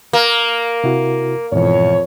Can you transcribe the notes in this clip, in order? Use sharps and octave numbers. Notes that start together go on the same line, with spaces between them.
A#3
C3 E4 F#4
F2 G#2 B2 E3 C#5